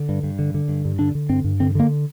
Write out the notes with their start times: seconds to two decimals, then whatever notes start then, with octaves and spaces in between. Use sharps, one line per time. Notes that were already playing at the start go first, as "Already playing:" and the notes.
Already playing: D3
0.09 G2
0.23 G2
0.39 D3
0.54 D3
0.68 G2
0.85 G2
0.99 D3 D4
1.15 D3
1.29 G2 C4
1.44 G2
1.60 D3 C4
1.75 D3 A#3